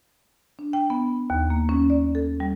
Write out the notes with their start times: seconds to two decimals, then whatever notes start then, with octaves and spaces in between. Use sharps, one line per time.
0.59 D4
0.73 G5
0.90 B3
1.30 D#2
1.50 A#3
1.69 C#4
1.90 D5
2.15 A4
2.40 G3